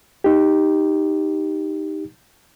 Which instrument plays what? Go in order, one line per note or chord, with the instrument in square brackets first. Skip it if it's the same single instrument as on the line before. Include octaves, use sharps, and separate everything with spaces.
[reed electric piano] D#4 G4